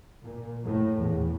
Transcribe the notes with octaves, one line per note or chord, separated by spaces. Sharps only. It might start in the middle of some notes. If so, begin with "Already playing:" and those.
A#2
A2
E2